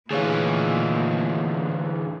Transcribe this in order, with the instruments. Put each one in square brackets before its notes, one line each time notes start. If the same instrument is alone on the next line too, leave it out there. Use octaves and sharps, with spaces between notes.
[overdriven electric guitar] D2 E3 [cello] A#2 D#3 [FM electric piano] G#4 C#5 F5